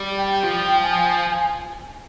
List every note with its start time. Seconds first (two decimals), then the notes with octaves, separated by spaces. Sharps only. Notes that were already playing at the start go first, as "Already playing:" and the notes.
Already playing: G3
0.18 G5
0.31 G5
0.43 F3
0.83 G#5